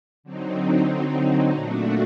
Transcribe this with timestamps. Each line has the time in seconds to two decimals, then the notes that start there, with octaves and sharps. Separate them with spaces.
0.23 D3 F#3 C4 D#4
1.53 A#2 A3 D4 F#4